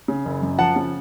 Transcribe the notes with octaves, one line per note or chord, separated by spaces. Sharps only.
C#3
F#1
F#2
F3 F#5 A5
C#3